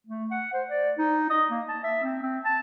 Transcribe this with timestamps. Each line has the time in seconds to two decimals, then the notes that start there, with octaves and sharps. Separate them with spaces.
0.07 A3
0.31 F#5
0.53 C5
0.69 D5
0.98 D#4
1.30 D#5
1.51 A#3
1.68 A5
1.83 E5
2.03 C4
2.22 C4
2.44 A5